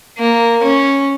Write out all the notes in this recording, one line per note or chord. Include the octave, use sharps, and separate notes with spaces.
A#3
C#4